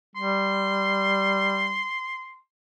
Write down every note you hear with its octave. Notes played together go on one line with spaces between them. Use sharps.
G3 C6